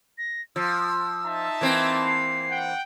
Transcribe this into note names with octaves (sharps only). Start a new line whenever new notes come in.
A#6
F3 E6
D#4 E5 A5
E3 A#3 C4 G#6
C7
F#5 G5